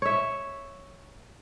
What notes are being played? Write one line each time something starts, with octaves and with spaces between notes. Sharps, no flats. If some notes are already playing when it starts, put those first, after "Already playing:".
C#5 E5